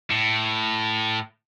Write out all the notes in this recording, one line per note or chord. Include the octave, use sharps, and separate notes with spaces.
A2